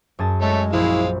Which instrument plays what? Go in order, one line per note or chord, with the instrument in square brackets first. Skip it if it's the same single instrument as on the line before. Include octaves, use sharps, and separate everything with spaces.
[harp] F#2 G#4 A5
[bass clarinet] G#3 [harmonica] A3 A4 C#5
[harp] A#1 C5 [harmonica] G#3 F5 [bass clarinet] E4